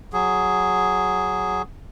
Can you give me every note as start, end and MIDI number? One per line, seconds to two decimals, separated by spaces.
0.13 1.62 54
0.13 1.62 68